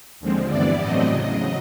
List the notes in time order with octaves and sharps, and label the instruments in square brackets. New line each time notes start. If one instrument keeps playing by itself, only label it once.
[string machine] D#2 D3 F3 G#3 C4
G2 E3 G3 B3 E4 D5
A2 F#3 A3 C4 D#5
E2 C#3 F#3